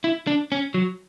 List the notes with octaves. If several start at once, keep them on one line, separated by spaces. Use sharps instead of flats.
E4
D4
C#4
F#3